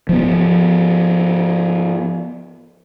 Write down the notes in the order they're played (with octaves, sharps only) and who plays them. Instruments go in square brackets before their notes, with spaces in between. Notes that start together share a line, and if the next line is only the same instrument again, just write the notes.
[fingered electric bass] F3 B3